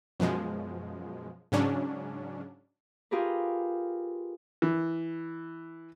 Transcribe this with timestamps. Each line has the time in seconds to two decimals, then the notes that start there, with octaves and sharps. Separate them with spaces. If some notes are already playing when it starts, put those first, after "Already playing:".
0.20 F#2 B2 F3 G#3
1.52 G#2 C#3 F#3 C#4 D4
3.11 F4 G4 G#4 A#4 B4
4.62 E3